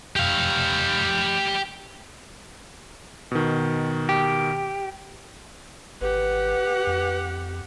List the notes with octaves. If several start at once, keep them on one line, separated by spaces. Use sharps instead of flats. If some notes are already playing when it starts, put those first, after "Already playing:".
G4 F5
B2 D#3
G4
G#1 G4 B4 F#5
F2